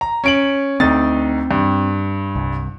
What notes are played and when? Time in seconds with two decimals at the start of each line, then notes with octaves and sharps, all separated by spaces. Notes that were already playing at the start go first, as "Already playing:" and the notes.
0.01 A#5
0.24 C#4 D7 F#7
0.80 D2 C4 D#4 A6
1.51 G2
2.36 C2